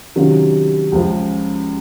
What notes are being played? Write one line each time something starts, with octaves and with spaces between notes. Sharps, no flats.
C3 D#3 F#3 C#4 F4
C#2 C#3 F3